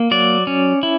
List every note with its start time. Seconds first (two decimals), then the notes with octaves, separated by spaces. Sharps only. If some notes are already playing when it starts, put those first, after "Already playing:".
Already playing: A#3
0.11 F#3 D5
0.47 C#4
0.83 E4